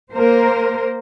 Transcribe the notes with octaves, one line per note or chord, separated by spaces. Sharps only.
A#3 A#4 C5